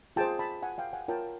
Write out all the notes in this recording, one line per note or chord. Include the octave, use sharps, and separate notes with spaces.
F4 G#4 C5 G5 A5
A5 B5
F#5 G#5
F5 G5
F#5 G#5
F4 A#4 C#5 G5 A5